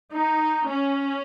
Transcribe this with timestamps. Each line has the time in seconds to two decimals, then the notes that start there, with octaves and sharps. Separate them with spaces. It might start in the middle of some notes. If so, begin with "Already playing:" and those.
0.12 D#4
0.69 C#4